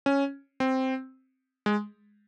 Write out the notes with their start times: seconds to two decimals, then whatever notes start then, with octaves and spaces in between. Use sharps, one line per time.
0.06 C#4
0.60 C4
1.66 G#3